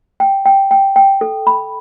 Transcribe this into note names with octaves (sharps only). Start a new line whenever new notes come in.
G5
G5
G5
G5
A4
B5